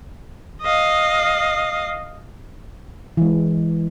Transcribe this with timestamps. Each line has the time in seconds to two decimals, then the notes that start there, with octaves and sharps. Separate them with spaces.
0.62 D#5 F5
3.17 E3 G#3